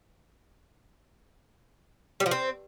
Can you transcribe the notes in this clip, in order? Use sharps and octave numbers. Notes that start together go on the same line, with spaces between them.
G3
F3
C4